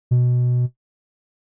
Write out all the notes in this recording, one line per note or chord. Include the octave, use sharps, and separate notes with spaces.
B2